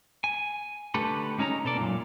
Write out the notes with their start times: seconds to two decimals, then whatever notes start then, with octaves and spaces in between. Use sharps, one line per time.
0.24 G#5
0.94 D3 A3 G4 A4 B4
1.38 G#3 C#4 D#4 C#5 A#5
1.64 B2 A4 D5
1.77 F#2 A#2